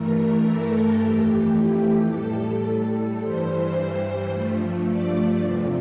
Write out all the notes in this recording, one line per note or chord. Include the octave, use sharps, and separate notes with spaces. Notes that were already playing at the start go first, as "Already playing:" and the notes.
Already playing: G2 E3 A3 A#4
A4
F2 E3 A3 G4
A2 G3 A4
G2 E3 G3 C5
G2 F3 A3
D5
E2 C3 F3